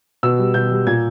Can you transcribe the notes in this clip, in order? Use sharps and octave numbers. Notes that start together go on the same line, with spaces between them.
B2 E6
G3
B2 G6
G3
A#2 G#6